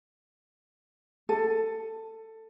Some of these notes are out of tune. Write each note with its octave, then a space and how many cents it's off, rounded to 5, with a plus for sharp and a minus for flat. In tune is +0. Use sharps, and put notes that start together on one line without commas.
A4 +15